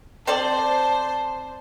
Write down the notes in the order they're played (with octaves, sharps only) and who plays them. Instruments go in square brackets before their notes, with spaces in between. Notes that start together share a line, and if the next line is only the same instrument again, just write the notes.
[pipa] C4 A4 D5 [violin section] C5 [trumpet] A5